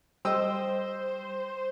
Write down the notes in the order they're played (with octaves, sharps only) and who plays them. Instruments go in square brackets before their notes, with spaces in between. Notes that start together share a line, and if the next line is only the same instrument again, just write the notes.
[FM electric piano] G3 [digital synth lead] C5 [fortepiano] D#5 G5 E6